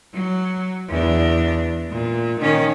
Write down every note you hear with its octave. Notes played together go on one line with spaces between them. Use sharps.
F#3
E2 D4
A#2
D#3 C#4